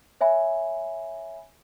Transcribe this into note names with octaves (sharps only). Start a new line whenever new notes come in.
C#5 E5 G#5 B5